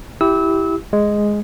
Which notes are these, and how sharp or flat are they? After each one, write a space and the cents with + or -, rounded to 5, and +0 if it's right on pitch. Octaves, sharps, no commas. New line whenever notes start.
E4 +0 G4 -5 E6 -25
G#3 +0 D#5 +0